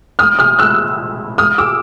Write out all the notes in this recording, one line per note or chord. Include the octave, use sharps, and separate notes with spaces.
D#6 F6
D#6 F6
E6 F#6
D#6 F6
D6 E6